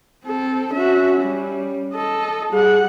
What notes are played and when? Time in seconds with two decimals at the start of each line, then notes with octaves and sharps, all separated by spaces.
0.25 C4 A4
0.73 C#4 F#4 E5
1.21 G3
1.94 A4 D#5
2.53 G3 G#4 F#5